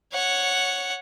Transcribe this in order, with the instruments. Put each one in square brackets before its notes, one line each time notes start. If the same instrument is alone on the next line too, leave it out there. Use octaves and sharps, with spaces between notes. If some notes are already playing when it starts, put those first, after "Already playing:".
[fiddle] C#5 F#5